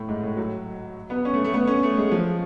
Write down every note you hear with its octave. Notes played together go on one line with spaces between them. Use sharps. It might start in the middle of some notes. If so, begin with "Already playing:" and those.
Already playing: A2
G#2
A2
F#3
B3
C#4
A3
A3
B3
C#4
A3
G#3
F3